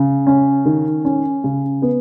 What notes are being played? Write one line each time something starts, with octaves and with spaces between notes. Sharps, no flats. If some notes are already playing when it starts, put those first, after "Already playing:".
Already playing: C#3
C#4
D#3
C#4
C#3
B3